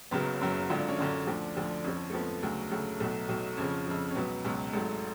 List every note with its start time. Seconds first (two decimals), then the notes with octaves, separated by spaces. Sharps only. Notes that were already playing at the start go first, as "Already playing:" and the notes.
0.11 F#1 F#2 C#3 F#3 B3
0.41 F#1 F#2 C#3 F#3
0.70 G#1 F#2 D3 F4
0.80 D4
0.88 C#4
0.98 G#1 F#2 D3 D4
1.27 D2 D3 F3 D4
1.57 D2 D3 F3
1.84 F2 F3 C#4
2.10 A3
2.13 F2 F3 B3
2.43 D2 C#3 F#3
2.71 D2 C#3 F#3 A3
3.00 B1 B2 F#3 A3
3.29 B1 B2 F#3
3.57 F2 C#3 F3 C#4
3.87 F2 C#3 F3
4.10 C#4
4.15 C#2 B2 F#3 B3
4.44 C#2 B2 F#3
4.73 G#1 G#2 F#3 A3